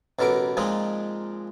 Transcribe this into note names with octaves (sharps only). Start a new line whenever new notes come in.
A1 B2 A4 A#4 D6
A#2 F3 G#3 C4 D#4